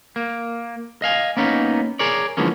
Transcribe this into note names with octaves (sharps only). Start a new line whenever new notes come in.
A#3
D#5 F5 G#5
A#3 B3 C#4 D#4
G#4 A#4 C#5 D5
D3 E3 F3 G#3 A#3 C#4